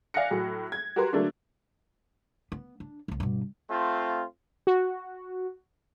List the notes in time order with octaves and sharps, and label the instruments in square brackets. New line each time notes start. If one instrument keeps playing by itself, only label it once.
[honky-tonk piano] D5 F5 G#5 F#6 A#6 C#7
A2 F#3
G#6
F#4 G4 A#4 B4 A#5 C6
D3 F#3 A3 A#3 D4
[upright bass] B3
D4
D1 C2
G2 B2
[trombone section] A3 C4 F4
[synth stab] F#4